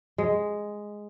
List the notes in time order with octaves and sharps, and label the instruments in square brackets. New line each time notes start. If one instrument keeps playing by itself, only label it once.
[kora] G#3